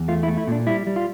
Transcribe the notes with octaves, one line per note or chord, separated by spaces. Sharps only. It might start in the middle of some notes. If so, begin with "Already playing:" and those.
Already playing: E2
A3 F4
E4
A3
E4
A#2 D4
G3 E4
G3
F4